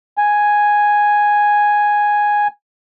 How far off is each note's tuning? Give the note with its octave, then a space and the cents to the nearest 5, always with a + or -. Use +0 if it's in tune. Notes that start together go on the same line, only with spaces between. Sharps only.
G#5 +0